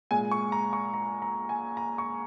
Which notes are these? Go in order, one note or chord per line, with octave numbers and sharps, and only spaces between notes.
A#2 G#3 G#5
C#6
A#5
C#6
A#5
A#5
G#5
A#5
C#6